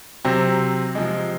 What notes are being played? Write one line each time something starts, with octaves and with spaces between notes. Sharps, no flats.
C3 F#3 C4
C3 F3 G#3